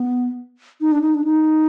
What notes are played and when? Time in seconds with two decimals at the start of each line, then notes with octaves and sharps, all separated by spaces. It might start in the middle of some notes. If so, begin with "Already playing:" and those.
Already playing: B3
0.81 D#4
0.92 D4
1.02 D#4
1.14 D4
1.24 D#4